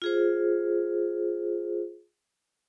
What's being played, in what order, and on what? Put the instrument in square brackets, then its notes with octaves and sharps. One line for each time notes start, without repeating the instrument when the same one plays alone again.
[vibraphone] F4 G#4 C5